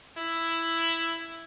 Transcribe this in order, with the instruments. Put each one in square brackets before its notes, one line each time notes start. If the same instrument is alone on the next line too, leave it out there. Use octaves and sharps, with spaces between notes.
[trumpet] E4